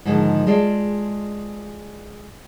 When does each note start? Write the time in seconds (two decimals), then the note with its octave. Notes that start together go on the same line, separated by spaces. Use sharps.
0.05 G#2 D3 D#3 F3 G#3
0.47 G#3 F4 A4 D5